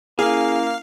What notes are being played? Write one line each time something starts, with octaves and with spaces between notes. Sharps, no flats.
A#3 C#4 E4 G#4 F5